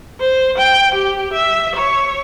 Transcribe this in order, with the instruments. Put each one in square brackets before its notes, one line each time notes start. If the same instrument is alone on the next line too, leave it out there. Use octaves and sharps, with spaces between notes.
[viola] C5
G5
G4
E5
C#5